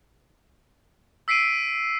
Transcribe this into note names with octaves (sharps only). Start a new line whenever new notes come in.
E6 B6 C7 D7 D#7